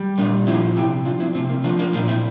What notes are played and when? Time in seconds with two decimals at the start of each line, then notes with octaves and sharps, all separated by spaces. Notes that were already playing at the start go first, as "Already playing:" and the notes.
Already playing: G3
0.18 A#2 A#3 D4
0.47 F3 C4 E4
0.76 C3 E4 G4
1.05 F3 D4 F4
1.20 C4 E4
1.35 C3 A3 C4
1.50 A#3
1.64 F3 A#3 D4
1.79 A#3 D4
1.93 A#2 A#3 D4
2.08 C4 E4